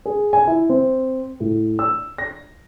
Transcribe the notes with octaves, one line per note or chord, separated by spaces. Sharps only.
G#4
G#5
E4
C4
A2
E6
A#6